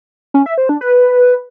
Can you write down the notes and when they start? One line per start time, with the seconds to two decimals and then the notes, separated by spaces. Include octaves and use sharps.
0.34 C#4
0.46 E5
0.58 C5
0.69 D4
0.81 B4